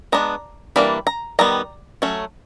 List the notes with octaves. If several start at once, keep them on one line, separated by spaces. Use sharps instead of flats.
G#3 B3 D4 A#5
E3 G3 A#3 D4 B5
A#5
D#3 G3 B3 A#5
F#3 A3 C#4